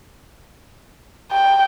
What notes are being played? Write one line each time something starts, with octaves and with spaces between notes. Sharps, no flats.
G5